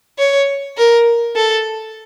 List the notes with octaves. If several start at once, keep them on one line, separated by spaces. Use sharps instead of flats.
C#5
A#4
A4